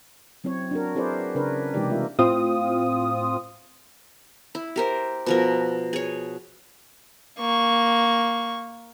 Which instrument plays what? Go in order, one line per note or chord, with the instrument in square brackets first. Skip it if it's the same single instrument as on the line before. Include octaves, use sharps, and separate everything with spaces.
[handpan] F#3 C4 E4 C#5
D4 F#4 A#4
C4 E4 G#4 B4 C5 D5
C#3 D4 A#4 B4 C#5
C3 E3 G#3 D#4 G4 D5
A3 D4 F4 A#4 E5
[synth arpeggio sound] A2 C4 F4 D#6
[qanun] E4
G4 A#4 C5
B2 F3 A#4
G#4 C#5
[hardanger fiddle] A#3 C#6